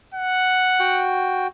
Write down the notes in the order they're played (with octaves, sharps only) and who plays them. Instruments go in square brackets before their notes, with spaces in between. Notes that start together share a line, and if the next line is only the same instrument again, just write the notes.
[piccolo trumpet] F#5
[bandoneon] F#4 G5